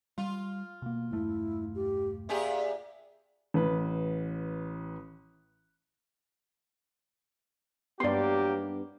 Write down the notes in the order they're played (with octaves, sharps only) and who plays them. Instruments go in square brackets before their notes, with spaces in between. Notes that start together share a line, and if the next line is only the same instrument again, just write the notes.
[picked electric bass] G3 [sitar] F4
[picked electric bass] B2 A#3
[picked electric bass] E1 G2 A3 [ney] E4
[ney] G4
[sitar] A#2 G4 G#4 [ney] E5
[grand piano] A1 B4
[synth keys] G2 B3 [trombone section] F#3 A#3 G4 [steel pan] D5 C6